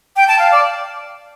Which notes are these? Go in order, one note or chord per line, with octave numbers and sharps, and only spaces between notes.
G5
A5
F5
D5